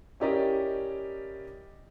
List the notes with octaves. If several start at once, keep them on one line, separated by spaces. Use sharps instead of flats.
C#4 E4 G4 A#4 D5 D#5